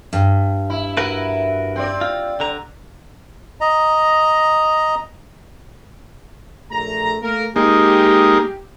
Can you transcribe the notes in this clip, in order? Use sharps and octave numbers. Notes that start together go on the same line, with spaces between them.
G2
E4
E4 F#4 A#4 B4
C4 D5
F4
D3 A#5
D#5 A#5
A#1 A3 A#5
A3 A#3 A#4
G#3 A#3 D#4 G4